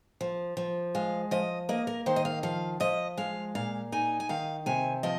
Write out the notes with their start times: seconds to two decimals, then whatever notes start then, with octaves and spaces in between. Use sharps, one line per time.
0.21 F3
0.57 F3
0.95 G#3 F5
1.31 F3 D#5
1.69 A#3 D#5
1.87 A#4
2.06 D#3 C5
2.16 D#5
2.25 F5
2.43 F3 F5
2.80 F3 D#5
3.17 G#3 F5
3.55 A#2 F5
3.92 D#4 G#5
4.20 G#5
4.29 D#3 F5
4.66 C3 G#5
5.03 F3 D#5